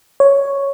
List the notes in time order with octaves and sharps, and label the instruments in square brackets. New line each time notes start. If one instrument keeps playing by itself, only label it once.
[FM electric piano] C#5